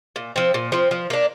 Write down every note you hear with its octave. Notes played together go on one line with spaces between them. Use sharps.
A#2
F3 C4
A#2
F3 C4
F3
A#3 D4